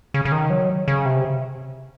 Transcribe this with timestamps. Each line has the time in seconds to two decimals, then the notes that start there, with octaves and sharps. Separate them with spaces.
0.14 C#3
0.25 C#3
0.32 D#3
0.50 F#3
0.88 C#3
1.05 C3